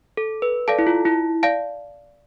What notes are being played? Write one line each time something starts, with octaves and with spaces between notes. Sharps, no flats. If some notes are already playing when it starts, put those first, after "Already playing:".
A4
B4
A4 D5 F5 A5
E4
F4
E4
D5 F5 A5